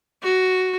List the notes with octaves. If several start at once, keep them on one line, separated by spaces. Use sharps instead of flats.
F#4